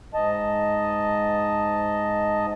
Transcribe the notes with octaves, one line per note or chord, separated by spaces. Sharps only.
G#2 D#5 A5